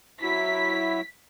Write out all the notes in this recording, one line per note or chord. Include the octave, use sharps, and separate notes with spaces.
F#3 E4 B6